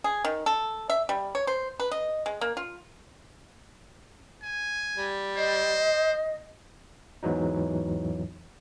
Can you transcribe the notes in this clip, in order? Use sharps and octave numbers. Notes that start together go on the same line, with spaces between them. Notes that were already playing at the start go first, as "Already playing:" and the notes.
G#4
D#3
A4
E5
G3
C#5
C5
B4
D#5
G#3
A#3
F4
G#5
G3
C5 D#5
E2 G#2 E3 F#3 D#4